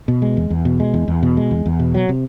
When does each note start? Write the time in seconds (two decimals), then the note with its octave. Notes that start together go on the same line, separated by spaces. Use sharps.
0.08 B2
0.22 G#3
0.37 E2
0.50 E2
0.65 B2
0.80 G#3
0.94 E2
1.08 E2
1.23 B2
1.37 G#3
1.51 E2
1.66 E2
1.79 B2
1.94 F#3
2.09 C3